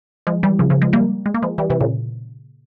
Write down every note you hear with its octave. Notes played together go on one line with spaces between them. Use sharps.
F3 G#3
E3 G3
C#3 F3
C#3 F3
F3 G#3
G3 A#3
G#3
A#3
F3 G#3
E3 G3
C3 E3
A#2 C#3